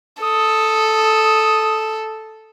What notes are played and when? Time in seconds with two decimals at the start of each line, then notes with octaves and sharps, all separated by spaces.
0.23 A4 D#6